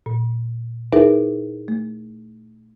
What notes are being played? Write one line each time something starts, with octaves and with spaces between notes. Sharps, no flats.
A#2
D#4 E4 G#4 A#4 B4 E5
A3